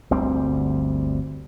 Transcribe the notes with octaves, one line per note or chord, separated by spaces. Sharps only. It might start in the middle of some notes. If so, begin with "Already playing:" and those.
G1 D2 G3 C4